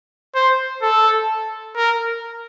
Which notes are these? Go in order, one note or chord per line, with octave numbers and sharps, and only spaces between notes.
C5
A4
A#4